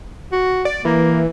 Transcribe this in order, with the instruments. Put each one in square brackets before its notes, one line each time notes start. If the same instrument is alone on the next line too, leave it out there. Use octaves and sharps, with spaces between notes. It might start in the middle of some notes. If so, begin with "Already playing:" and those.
[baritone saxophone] F#4
[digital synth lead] D5
[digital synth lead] E3 [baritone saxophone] A#3